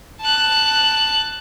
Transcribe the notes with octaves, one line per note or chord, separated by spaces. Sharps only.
A5 F#6